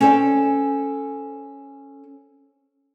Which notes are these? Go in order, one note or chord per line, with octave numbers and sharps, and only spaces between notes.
C#4 A4 C5 D5 G5